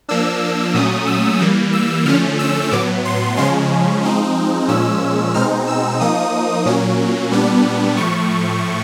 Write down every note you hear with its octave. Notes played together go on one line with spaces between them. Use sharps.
F3 A#3 D4 E6
A#2 F#3 A3 C#4 D#6
E6
E3 G3 A#3
E6
D3 F3 A3 C#4 F6
E6
A2 F#3 B3 D6
C6
C#3 F3 G#3 C#4 C6
F3 G#3 C4 D#4
A#2 F3 G#3 C#4 E6
B2 G#3 C4 D#4 F6
E6
F3 A#3 D#4 D#6
A#2 F#3 A#3 C#4
A#2 G3 B3 D4
A2 F3 A3 C#6